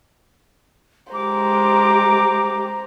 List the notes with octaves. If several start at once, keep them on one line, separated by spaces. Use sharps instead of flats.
G#3 G4 C5 A#5 D6